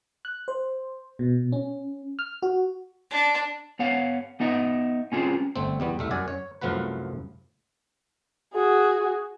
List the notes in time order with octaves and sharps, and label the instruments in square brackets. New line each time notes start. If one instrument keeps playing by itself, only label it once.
[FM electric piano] F#6
C5
B2
C#4
F6
F#4
[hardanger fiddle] D4
[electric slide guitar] B3 C#5 F5 F#5
B3 D#4 D#5 E5
C4 C#4 F4 G4 G#4
[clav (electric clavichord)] G1 A3 C4
E2 G3 B3
C2 A3 E5
F#2 F#4 D5 G#5
C#5
C2 F#2 F3 A3 F#4 B4
[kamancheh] F#4 G#4